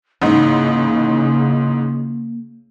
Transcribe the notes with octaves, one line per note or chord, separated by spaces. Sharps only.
A1 G#2 C#3 A#3